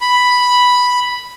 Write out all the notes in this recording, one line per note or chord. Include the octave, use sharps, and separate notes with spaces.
B5